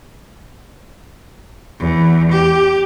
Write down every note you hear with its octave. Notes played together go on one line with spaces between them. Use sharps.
E2
G4